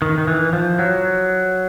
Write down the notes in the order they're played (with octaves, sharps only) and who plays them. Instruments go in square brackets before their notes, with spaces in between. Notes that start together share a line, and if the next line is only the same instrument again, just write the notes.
[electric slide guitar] D#3
D#3
E3
F3
F#3